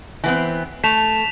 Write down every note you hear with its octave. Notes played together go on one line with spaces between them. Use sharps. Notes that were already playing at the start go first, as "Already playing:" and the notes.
E3 B3 C4
A3 B6 E7 F7